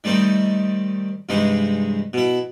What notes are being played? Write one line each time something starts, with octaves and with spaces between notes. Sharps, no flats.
D#3 G3 A3 C4 D#4
G2 C3 E3 G#3 D#4
B2 E4